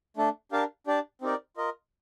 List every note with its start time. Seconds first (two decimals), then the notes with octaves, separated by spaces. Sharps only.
0.17 A3 D4 A4
0.52 D4 G4 A#4 F5 A5
0.87 D4 G4 D5 A5
1.22 C4 D#4 G4 A#4 D5
1.57 F4 A#4 D#5